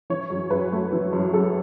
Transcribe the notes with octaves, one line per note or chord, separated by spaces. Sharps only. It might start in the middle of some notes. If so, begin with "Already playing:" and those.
E3 C#5
F#2
F#2 B4
A3
E3
F#2
F#2 A4